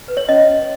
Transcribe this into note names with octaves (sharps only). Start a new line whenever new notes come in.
B4
C#5
C#4 D#5